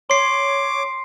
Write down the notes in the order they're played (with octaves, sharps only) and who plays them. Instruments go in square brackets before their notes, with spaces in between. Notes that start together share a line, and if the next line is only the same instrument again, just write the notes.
[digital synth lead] C#5 [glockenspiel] C6 C7 [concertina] D6